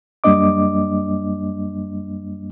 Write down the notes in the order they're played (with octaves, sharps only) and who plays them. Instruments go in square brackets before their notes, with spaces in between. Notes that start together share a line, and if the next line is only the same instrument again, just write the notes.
[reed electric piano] F#2 G3 A#3 D4 D#5 D6